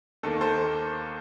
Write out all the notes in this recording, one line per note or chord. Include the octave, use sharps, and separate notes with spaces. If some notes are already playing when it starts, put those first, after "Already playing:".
D#2 D#3 A#3 A4
A4 C5